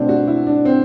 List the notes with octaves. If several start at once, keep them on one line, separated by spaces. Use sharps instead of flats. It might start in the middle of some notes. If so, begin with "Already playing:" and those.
Already playing: B2 A3 C4 D4
F#4
E4
D4
C4